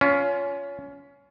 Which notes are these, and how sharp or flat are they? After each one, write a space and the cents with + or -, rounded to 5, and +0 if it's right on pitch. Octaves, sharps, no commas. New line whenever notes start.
C#4 +25 F4 +0